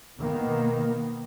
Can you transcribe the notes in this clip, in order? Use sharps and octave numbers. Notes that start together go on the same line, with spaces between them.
B2 D#3 A#3 B3